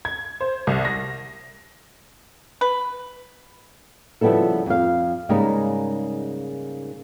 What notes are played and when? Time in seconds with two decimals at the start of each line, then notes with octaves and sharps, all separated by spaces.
0.05 G#6
0.41 C5
0.67 C2
0.85 A#6
2.61 B4
4.21 C#3 F3 G3 B3 E4 A4
4.66 F2 F5
5.29 G#2 C#3 G3 G#3 A#3 D#4